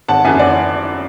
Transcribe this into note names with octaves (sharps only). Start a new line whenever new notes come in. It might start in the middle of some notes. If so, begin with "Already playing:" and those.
G#1 F#5 A5
F#2 E3 E5 G#5
D5 F#5